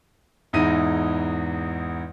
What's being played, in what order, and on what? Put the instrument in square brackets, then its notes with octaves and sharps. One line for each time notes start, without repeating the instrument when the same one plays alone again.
[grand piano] E2 G#2 D#4 E4 A#6 D#7